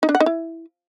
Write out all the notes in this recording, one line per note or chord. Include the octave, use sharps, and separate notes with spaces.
D#4
D4
F#5
D#4
E4